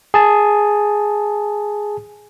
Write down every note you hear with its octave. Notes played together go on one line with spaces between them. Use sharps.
G#4 A5